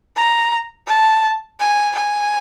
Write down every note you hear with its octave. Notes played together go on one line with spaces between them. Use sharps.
A#5
A5
G#5
G#5